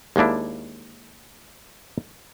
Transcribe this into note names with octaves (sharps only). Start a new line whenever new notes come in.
D#2 G#3 A#3 D4 E4